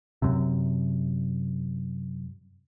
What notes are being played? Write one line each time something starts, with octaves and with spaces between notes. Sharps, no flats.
F#2 C3